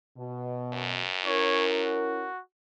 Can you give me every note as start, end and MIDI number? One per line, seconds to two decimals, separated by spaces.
0.18 1.03 47
0.73 2.15 42
1.26 2.27 61
1.26 2.27 64
1.26 2.27 70
1.26 1.64 73
1.70 2.41 66